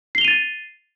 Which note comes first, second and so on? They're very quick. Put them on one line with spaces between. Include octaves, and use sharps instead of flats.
C7 G7 F7 D#7 A6